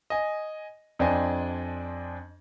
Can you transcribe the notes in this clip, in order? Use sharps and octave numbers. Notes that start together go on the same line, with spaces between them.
D#5 G#5
F2 D4 C5 D#5 G#5